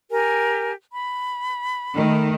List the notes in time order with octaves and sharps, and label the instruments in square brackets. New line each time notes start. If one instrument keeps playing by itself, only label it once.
[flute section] G4 A#4 G#5
B5
[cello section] D#3 A3